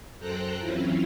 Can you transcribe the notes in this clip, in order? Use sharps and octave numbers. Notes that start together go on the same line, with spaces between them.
F#2 A4 C5 G5 A#5 F#6
E3 F#3 C4 C#4 E4 F4